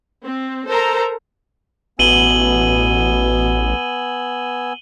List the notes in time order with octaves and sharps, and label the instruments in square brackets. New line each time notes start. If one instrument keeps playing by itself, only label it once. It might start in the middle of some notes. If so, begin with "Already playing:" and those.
[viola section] C4
A4 A#4 C5 A#5
[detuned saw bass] A1 [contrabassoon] B2 [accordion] B3 G#5 E6 [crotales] D#7 F#7 G7